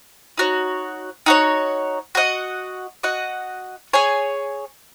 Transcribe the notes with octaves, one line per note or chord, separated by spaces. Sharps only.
D#4 F#4 C#5
D#4 F#4 C#5
F#4 D#5 F#5
F#4 D#5 F#5
G#4 C#5 G#5